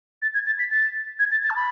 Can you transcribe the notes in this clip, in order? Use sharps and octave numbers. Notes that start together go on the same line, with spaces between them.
A6
G#6
A6
B6
A6
G#6
A6
A6
A5
B5